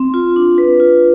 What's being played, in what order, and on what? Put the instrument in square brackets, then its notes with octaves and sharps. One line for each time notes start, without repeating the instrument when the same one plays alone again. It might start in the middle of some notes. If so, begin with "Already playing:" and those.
Already playing: [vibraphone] C4
F4
D4
B4
F4